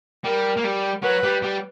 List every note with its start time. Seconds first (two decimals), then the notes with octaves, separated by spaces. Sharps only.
0.25 G3 A#4
0.57 A#3
0.64 G3
1.03 F#3 B4
1.23 G3
1.43 G3